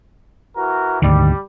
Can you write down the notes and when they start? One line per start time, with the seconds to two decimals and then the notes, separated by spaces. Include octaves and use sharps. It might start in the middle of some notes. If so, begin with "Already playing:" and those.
0.57 E3 F#4 A#4
1.02 D2 G#2 D#3 G3